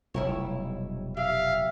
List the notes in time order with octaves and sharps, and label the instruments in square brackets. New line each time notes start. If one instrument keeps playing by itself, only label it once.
[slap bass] F1 B1 [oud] G3 E4 C#5
[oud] G4 [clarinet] E5 [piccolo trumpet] F5